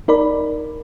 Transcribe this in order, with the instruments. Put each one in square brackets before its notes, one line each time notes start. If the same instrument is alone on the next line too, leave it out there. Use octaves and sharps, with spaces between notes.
[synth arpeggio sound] D#4 A#4 D5 B5